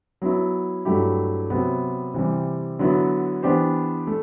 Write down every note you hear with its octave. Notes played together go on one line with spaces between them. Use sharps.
F#3 B3 E4
G2 F#3 A3 E4 G4
C3 F#3 B3
C3 E3 G3
D3 F#3 B3 E4
E3 B3 D4 G4 C5
A3